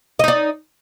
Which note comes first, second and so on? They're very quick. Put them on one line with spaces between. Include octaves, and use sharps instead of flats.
D#5 D#4 D5